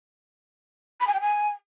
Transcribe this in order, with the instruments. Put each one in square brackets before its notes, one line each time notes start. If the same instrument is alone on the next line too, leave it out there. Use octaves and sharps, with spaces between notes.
[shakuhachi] B5
G#5
G5
G#5